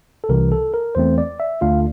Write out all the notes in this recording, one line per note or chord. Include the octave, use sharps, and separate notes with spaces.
A4
C2 C3 E3 A#4
A4
A#4
E2 E3 A3 C4 C5
D5
E5
D2 D3 A3 D4 F4 F5